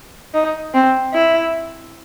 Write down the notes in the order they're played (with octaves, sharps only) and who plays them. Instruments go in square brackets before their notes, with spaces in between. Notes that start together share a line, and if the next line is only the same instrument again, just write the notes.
[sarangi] D#4
C4
E4